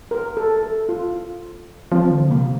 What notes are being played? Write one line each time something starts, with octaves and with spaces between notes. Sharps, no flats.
A#4
A4
A4
F4
F3 C4
D3
C3 A#3